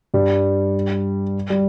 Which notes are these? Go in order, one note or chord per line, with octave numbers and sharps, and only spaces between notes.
G2 G3
G3